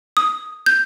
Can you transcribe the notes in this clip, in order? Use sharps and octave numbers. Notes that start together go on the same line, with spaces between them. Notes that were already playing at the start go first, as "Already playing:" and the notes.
D#6
G6